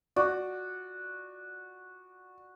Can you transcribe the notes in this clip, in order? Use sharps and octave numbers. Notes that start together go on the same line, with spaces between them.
F#4 D5